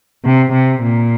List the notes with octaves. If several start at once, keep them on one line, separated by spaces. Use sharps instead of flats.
C3
C3
A#2